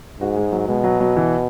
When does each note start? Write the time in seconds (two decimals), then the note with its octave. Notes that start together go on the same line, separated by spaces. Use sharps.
0.20 G#2 F#4
0.36 G#3
0.52 F#3
0.68 B2 G#3
0.84 F#3
1.00 F#3
1.17 E3